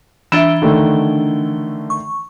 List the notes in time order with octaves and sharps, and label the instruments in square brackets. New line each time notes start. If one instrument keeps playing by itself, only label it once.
[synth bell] E3 D4 G7 [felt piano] E5 E7
[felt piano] D3 D#3 A3
[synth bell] C#6